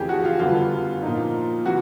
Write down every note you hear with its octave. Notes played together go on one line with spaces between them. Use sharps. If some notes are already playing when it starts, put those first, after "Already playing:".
Already playing: F2 C#3 E3 A3 G4 G#4
F#4
F4
F#2 D3 G3 B3 F4
A#2 F3 A#3 D#4
C3 E3 F#4